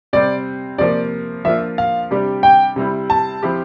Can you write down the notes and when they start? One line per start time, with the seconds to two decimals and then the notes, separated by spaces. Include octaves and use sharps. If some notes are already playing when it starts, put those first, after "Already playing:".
0.13 C3 G3 C4 D5
0.78 C3 F3 A#3 D5
1.45 F3 A#3 D4 F4 E5
1.78 F5
2.11 C3 G3 D4 G4
2.43 G5
2.76 C3 G3 C4 E4
3.10 A5
3.42 F3 C4 E4 G4